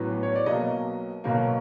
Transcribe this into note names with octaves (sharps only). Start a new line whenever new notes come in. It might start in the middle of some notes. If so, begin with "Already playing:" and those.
Already playing: A1 A2 F#3 B3
C#5
D5
B1 B2 F#3 A#3 D#5
B1 B2 F#3 A#3